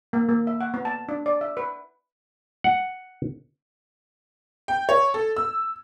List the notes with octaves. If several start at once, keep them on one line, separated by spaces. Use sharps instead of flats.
A#3
A#3
E5
F#5
B3
A5
D4
D5
E5
B4
F#5
G5
C#5
A4
E6